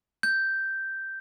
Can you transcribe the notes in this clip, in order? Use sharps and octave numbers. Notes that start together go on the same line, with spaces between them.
G6